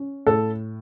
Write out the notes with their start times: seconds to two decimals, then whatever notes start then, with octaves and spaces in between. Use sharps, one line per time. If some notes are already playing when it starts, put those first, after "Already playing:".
Already playing: C#4
0.26 A2 A4